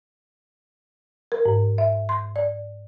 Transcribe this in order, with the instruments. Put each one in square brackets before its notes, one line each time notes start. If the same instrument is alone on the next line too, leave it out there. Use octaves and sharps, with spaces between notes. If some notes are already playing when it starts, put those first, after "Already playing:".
[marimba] A#4
G#2
E5
C6
D5